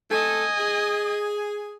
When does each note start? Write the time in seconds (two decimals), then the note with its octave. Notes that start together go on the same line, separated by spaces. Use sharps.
0.10 A3 C4 A4 D#5 G#5
0.58 G#4